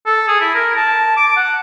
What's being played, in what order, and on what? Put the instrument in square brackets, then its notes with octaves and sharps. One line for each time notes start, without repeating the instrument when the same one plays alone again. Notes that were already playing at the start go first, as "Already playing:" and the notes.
[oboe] A4
G#4
E4
A#4
A5
D6
F#5